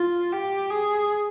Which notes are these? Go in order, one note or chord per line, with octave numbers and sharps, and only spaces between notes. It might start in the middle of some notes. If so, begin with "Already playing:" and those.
Already playing: F4
G4
G#4